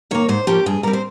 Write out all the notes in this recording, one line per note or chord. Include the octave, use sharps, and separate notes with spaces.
D#3 A#3 C#5
G#2 C5
F3 A#3 C#4 G4
G2 G#4
G3 C4 A#4
C5